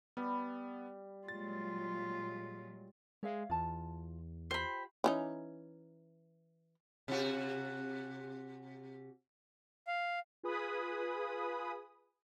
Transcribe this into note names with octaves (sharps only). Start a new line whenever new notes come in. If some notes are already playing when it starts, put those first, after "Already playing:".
G3 B3
A#2 F#3 G#3 F4 A6
G#3 C#5 E5 F5
E2 F4 A5
F4 G4 C5 G5 B5
E3 C#4 D#4
C3 F#4
F5
F4 G#4 B4 G#5 B5 D#6